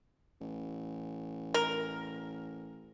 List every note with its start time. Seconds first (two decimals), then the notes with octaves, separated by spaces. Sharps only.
0.40 A1
1.54 A#4